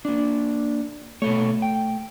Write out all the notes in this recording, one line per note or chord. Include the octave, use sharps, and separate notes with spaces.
A#3 D4
B2 A3 A4 C#5
G5